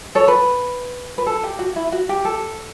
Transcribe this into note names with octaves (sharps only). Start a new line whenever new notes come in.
A4 C#5
B4
B4
A4
G4
F#4
E4
F#4
G4
A4